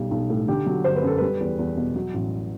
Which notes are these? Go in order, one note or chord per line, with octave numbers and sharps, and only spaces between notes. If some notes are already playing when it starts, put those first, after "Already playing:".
Already playing: B1 G3
B1
A2
D3 G4
F#3
G1 C5
B4
F#2 A4
G3 B4
E2
E2
B2
F#3
A1